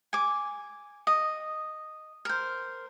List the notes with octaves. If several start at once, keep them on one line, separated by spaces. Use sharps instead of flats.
G#5 D6
D#5
A#4 C5